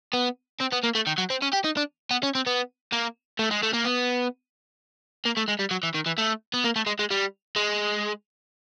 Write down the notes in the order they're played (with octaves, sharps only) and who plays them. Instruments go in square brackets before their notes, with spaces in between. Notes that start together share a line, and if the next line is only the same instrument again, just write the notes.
[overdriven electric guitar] B3
C4
B3
A#3
A3
D#3
F#3
C4
C#4
G4
D#4
D4
B3
C#4
C4
B3
A#3
A3
G#3
A3
A#3
B3
A#3
A3
G#3
G3
F#3
E3
D#3
E3
A3
B3
A#3
A3
G#3
G#3
G3
G#3